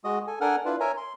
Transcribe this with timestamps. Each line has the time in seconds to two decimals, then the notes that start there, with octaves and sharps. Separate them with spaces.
0.04 G#3 F#4 D#5 D#6
0.27 A4 G#5
0.41 D4 A4 A#4 F#5 G#5 F6
0.65 D4 E4 F4 B4
0.80 A#4 C#5 E5 G#5 A#5
0.97 C6